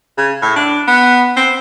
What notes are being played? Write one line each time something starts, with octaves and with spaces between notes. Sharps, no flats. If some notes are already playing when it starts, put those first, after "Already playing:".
C#3
A2
D4
B3
C4